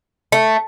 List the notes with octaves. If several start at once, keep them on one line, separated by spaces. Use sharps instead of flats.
A3